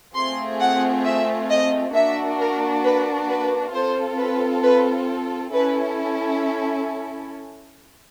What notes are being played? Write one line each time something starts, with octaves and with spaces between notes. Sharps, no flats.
A3 C4 F4 G#4 C6
F#5
E5
D#5
A#3 D4 F#4 E5
A#4
B4
B4
C4 F4 A4 C5
B4
B4
C#4 E4 A4 B4